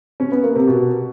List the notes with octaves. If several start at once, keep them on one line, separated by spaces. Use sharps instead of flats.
C#4
B3
A#3
C3
B2